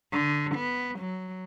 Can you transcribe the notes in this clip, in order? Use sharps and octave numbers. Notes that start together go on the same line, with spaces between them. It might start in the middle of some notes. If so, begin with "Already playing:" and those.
D3
B3
F#3